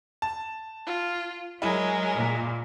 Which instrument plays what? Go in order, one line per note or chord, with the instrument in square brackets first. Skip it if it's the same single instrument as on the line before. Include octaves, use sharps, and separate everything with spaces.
[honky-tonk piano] A5
[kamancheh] F4
[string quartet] F#3 [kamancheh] G#3 A#4 [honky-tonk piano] E4 G#4
[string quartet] A#2